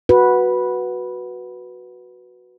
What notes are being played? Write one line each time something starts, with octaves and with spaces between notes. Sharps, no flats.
F#4 B4